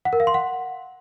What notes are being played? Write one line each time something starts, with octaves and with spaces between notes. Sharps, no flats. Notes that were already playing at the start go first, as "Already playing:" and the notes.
F#5
A#4
F5
C6
F#5